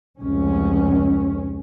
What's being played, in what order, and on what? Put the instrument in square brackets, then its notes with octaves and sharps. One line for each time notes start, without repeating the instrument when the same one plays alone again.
[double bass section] F1 C#2 C#4